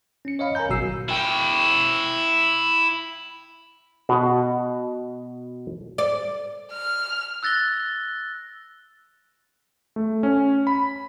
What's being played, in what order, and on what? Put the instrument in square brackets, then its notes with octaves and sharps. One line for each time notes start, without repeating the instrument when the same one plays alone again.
[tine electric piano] C#4 C#7
C#5 D#5 F5 B5
A#4 C#5 G#5 A#5 G6
G#1 B2 F#3 F#4 E6 C7
[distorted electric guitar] E4 G5
[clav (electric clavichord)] B2 F#4
[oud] D5
[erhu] F6
[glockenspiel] E6 F#6 A6 A#6 G7
[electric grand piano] A3
C#4
B5